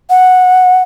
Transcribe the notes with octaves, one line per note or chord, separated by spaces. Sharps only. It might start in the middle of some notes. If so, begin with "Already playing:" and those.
F#5